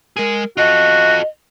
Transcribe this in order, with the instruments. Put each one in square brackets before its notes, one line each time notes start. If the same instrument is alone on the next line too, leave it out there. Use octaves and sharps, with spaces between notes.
[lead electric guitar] G#3 G#4 [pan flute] A#4
[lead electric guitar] F4 A4 [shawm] F#4 [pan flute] D#5